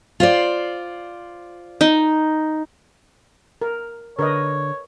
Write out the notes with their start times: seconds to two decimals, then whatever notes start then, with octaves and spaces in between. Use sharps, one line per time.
0.20 F4 C5 D5
1.81 D#4
3.62 A#4
4.19 D3 A#4 B4 C#5 D#5